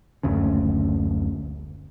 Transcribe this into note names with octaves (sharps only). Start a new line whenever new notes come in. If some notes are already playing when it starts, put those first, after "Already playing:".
F#1 D2 C#3